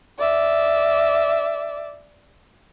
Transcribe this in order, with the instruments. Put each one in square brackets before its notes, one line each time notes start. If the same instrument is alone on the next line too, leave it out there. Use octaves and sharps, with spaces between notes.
[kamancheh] D5 E5